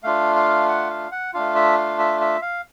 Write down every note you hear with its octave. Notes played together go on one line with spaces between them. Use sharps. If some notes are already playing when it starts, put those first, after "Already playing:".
A3 D4 F4 F5
F5
F#5
F5
F#5
A3 D4 F4 F5
E5
F5
E5
E5
F5